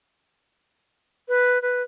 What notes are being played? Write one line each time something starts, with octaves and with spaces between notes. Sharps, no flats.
B4
B4